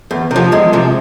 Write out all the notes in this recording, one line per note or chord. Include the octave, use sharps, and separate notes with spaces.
E2
C3 F3
E2 G#3
C3 F3